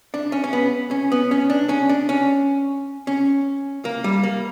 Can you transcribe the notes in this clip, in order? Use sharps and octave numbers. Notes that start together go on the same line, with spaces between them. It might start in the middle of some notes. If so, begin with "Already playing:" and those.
D4
C#4
C#4
B3
C#4
B3
C#4
D4
C#4
D4
C#4
C#4
A#3
G3
A#3